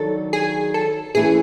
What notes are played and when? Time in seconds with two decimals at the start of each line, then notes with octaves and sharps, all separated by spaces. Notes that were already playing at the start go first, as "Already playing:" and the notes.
Already playing: D#3 F#3 D4 A4
0.33 G#4
0.74 A4
1.15 E3 A3 C#4 E4 G#4